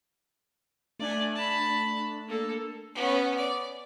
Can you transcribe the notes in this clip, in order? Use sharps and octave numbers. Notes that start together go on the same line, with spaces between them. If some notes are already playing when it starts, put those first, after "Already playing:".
A3 D4 D5 G#5
A5 B5
A#3 A4
B3 C#4
D5